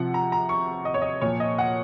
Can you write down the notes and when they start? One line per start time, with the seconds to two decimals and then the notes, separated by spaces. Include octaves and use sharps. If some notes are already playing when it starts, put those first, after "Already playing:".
Already playing: C3 F3 F#5
0.14 A#5
0.32 A#5
0.49 C#6
0.85 D#5
0.94 C#5
1.02 D#5
1.21 A#2 F3 C#5
1.40 D#5
1.58 F#5